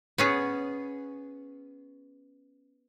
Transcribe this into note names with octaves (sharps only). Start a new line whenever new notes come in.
B3 C#4 G#4